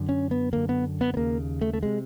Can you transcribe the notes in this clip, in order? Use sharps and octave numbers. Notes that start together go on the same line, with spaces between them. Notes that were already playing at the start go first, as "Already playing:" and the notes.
Already playing: F#2 D3
C#4
B3
F#2 D3 A#3
B3
B3
B3
D#2 C#3 A#3
A3
A3
C3 G#3